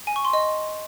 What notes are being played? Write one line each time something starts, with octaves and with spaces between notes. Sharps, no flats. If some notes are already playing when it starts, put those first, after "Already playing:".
G#5
C#6
C6
D#5